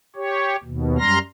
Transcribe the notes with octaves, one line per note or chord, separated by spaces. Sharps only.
G4 C#5
D#2 B2
F#2 G3 A#5 C6 F6 A#6